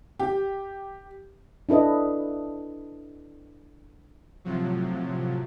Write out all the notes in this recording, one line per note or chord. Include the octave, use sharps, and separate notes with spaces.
G4
D4 E4 A4 B4 D#5
A2 C3 F3 F#3